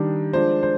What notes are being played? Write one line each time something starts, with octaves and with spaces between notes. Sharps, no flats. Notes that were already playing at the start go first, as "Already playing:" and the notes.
Already playing: D#3 G3 D4
F3 G#3 D4 C5
C5